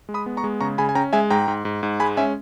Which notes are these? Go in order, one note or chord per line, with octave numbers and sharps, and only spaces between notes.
G#3
B5 D#6
B3
A#5 C#6
G#3
C#3 A#5 C#6
C#3 G#5 B5
G#5
C#4 G5 A#5
G#3 E5 G#5
G#2 G5 A#5
G#2
G#2
G#2
G#3 G#5 B5
C#4 E5 G#5